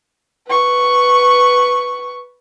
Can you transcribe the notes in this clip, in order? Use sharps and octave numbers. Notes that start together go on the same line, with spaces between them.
B4 C#6